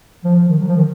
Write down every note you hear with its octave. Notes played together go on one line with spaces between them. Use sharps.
F3
F3
D#3
F#3
F3
D#3